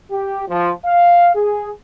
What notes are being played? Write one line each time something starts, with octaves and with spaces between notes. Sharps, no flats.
G4
F3
F5
G#4